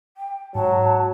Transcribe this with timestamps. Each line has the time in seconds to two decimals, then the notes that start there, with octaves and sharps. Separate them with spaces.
0.17 G5
0.55 G#2 F#3 A5